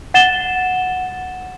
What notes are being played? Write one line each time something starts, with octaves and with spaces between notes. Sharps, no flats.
F#5 A6 E7 G7